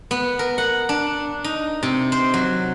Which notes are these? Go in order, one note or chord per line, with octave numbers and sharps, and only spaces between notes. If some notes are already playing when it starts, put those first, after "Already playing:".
B3
A#4
F#5
D4
D#4
C3
C5
F#3